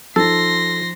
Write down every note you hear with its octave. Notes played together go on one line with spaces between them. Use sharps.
F3 D#4 A4 C6 A#6